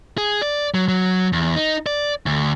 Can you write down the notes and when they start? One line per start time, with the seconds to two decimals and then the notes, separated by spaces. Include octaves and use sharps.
0.18 G#4
0.42 D5
0.74 F#3
0.88 F#3
1.33 E2
1.56 D#4
1.86 D5
2.26 D2